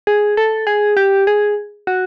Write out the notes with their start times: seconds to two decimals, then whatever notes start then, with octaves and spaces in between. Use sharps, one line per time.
0.07 G#4
0.37 A4
0.67 G#4
0.97 G4
1.27 G#4
1.87 F#4